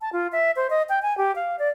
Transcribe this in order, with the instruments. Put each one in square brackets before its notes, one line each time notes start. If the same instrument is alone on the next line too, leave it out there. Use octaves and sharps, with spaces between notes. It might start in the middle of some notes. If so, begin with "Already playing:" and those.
[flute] A5
F4
E5
C5
D#5
G5
G#5
G4
F5
D5